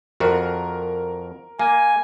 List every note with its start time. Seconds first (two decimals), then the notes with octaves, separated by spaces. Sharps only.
0.20 F2 F#4 A#4
1.59 A#3 G#5